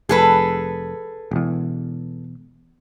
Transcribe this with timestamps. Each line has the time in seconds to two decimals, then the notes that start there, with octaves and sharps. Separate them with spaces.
0.09 F1 G#4 A4 B4
1.31 E1 E2